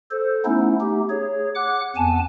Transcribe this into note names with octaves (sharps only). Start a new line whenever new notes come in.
A4 C5
A3 B3 C#4 D#4 E4
A3 D#4 G4
G#4 C#5
F#5 D6 F#6
F2 B3 C4 G#5 A5